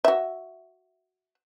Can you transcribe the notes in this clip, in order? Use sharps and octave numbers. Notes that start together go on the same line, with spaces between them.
F#4 E5